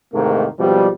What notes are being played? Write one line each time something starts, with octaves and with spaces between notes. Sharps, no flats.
E2 G#2 C3 D#3 A3 A#3
G#1 B2 F3 G3